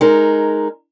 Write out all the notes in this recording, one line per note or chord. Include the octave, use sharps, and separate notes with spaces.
G#3 D#4 A#4